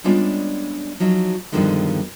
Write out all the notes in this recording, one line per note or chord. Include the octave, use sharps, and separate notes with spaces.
G3 G#3 B3 C#4 D4 F4
F3 F#3 D#4
G2 B2 D3 D#3 F3 G#3